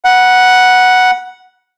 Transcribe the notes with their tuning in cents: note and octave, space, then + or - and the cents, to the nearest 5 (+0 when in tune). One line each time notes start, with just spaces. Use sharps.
F#5 +0 B5 -40